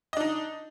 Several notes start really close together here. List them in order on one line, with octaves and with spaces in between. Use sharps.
D#5 D4 D#4